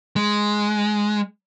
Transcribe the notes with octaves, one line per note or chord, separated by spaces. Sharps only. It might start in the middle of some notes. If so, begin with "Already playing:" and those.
G#3